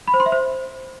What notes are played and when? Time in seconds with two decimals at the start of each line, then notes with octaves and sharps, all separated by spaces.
0.08 B5
0.14 C5
0.20 C6
0.26 E5
0.32 C5